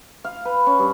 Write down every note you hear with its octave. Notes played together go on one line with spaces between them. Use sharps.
F5
B4
C#4
G2